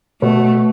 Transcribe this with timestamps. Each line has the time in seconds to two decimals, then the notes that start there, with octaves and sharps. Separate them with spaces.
0.22 B2 A3